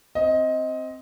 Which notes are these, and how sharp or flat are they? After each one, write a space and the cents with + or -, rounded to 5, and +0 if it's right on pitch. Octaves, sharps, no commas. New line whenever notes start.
C4 +0 D#5 +15